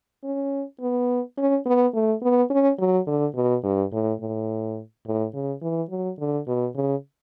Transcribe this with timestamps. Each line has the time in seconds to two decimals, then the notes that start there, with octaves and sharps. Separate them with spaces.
0.24 C#4
0.81 B3
1.38 C#4
1.66 B3
1.94 A3
2.22 B3
2.50 C#4
2.79 F#3
3.07 D3
3.35 B2
3.63 G2
3.92 A2
4.21 A2
5.06 A2
5.34 C#3
5.62 E3
5.90 F#3
6.19 D3
6.47 B2
6.75 C#3